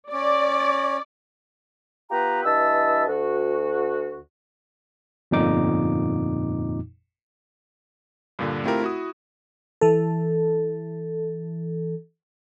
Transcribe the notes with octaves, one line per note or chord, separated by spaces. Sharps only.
C#4 D5
B3 F4 G4 B4 G5 A#5
G2 E3 D#5 E5 A5 E6
D2 F#4
G1 F2 A#2 D#4 D6
G2 A#2 D3
A3 C4 E4 F4 G4 A#4
E4 F#4 D#6
E3 A4